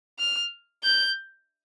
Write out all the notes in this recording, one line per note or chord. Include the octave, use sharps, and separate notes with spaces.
F6
G6